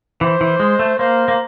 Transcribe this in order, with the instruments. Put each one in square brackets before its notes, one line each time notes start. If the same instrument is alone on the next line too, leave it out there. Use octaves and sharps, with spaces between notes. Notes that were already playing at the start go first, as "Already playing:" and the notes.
[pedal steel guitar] E3 [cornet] C5
[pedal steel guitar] E3
G#3
A3
[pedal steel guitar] A#3 [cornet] C5
[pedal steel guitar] A#3